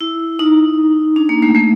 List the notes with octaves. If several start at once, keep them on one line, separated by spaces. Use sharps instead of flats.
E4
D#4
D4
A#3
A3
A3